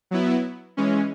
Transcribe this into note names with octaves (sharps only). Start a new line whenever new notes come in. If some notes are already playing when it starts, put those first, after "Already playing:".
F#3 B3 E4
E3 G#3 C#4